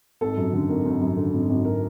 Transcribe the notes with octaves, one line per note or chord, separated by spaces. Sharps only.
G#1 A4
F#2
D3
G#1 A#4
G#1
F#2
D3
G#1
G#1
A#4